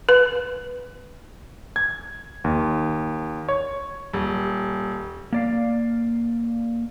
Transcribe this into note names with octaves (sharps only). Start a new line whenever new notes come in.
B4
G#6
D#2
C#5
D#1
A#3 D5 F5